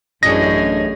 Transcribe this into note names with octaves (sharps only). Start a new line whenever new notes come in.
A1 F#2 D4 G#4 C#5 D#5 A#6